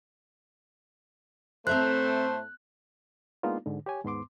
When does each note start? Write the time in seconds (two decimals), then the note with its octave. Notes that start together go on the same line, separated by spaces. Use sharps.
1.67 A2 A3 C4 C5 E5 A#5 F#6
3.43 G#3 A#3 B3 D4 D#4 F4
3.66 G#2 D3
3.86 G4 C#5 G#5
4.04 D#2 G#2 B3 C6 D6